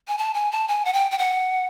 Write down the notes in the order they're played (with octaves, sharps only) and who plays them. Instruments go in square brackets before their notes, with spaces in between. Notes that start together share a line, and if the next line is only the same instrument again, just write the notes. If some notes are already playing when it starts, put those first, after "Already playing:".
[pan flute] G#5
A5
G#5
A5
G#5
F#5
G5
G5
F#5